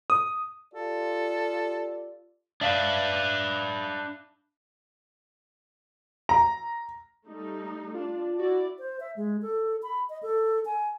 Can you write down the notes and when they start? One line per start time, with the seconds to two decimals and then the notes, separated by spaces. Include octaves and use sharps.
0.10 D#6
0.74 F4 G4 A4 D5
2.61 D4 B4 D5 E5 F5
6.29 A#5
7.27 G3 A3 D#4
7.94 D4 F4
8.39 E4 F#4 D5
8.79 C5
9.00 E5
9.16 G#3
9.42 A4
9.83 B5
10.10 D#5
10.23 A4
10.65 G#5